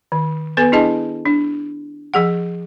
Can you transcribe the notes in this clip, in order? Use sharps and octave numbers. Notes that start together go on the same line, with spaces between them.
D#3
B3 A4 B4 G#5
D4 E4 G#4 D#5 A5
D4
F3 G#4 F#5